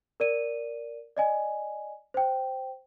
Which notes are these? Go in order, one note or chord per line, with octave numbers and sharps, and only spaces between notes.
A#4 D5 D#7
D5 D#5 G#5
C5 G5